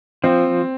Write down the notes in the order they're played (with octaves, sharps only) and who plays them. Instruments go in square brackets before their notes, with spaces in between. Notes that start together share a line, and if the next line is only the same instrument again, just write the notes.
[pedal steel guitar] F3 [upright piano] C4